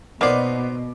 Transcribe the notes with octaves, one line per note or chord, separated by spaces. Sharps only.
B2 A#3 B3 D#4 C5 D5 D6